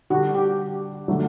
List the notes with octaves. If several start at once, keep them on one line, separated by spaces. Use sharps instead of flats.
D3 G3 D4 F#4
G4
D3 F#3 A3